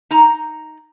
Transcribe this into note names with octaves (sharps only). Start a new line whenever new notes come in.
D#4 A#5